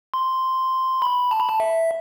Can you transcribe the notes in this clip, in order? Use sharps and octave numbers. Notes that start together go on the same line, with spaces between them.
C6
B5
A5
B5
A5
E5